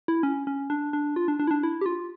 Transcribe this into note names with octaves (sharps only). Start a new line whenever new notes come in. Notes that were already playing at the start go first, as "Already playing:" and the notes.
E4
C#4
C#4
D4
D4
F4
D4
D4
E4
D4
E4
G4
F4